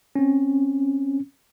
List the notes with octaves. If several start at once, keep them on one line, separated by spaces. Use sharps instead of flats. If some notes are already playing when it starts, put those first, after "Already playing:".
C4 C#4